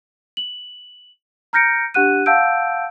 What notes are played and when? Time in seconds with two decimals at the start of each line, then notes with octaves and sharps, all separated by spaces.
0.37 F#7
1.53 A#5 F6 G6 A#6 C#7 D7
1.94 D4 G4 F#5 F#6 D#7
2.26 F5 F#5 A5 E6 G6 D7